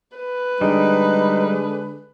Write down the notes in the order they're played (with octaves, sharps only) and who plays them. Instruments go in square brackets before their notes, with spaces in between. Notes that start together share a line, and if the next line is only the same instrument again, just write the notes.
[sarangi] B4
[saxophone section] D3 G#3 D4 [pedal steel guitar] G3 [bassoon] D#4